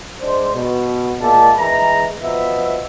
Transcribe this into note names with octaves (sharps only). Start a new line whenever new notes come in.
G#2 D4 C5
B2
A#2 G#3 D5 E5 A5
E3 G#3 A#5
B2 F3 B3 E5